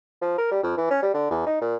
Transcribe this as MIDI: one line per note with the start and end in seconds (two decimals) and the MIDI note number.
0.22 0.35 53
0.38 0.50 70
0.51 0.60 55
0.63 0.77 41
0.77 0.86 52
0.91 1.00 61
1.02 1.12 55
1.14 1.29 50
1.31 1.43 40
1.46 1.59 63
1.61 1.76 46